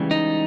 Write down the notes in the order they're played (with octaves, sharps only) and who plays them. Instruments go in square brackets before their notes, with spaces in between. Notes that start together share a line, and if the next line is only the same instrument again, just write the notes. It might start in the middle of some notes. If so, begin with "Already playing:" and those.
Already playing: [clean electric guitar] C#2 C#3 E3 G3
D#4